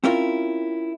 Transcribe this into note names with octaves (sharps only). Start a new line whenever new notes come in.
C4 C#4 E4 F4 A#4